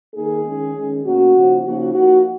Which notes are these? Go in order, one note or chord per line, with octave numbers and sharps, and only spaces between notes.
D#3 A#3 D#4 G#4
D#3 G#3 C#4
D#3 G#3 C#4
B2 A#3 C#4 F#4
C#3 F3 A#3 D#4
C#3 F3 A#3 D#4 F#4
F3 A#3 D#4 F#4